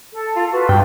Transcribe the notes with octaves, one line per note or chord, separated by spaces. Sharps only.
A4
F4
F4 F#4 B4
G2 G5